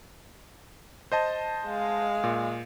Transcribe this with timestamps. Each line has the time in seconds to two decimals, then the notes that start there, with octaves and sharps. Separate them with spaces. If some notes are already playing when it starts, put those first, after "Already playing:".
1.12 C5 D#5 A5
1.66 G#3 F5
2.24 A#2